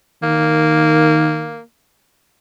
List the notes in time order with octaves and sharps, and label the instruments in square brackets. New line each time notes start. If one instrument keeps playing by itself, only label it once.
[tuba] D#3 [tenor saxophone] A#3